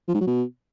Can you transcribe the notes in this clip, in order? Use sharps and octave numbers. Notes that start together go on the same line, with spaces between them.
F3
G#2
F#3
B2